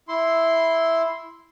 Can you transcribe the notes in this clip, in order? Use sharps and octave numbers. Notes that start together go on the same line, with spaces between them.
E4 C6